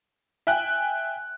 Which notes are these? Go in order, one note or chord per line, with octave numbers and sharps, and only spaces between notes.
E5 G5 G#5 F#6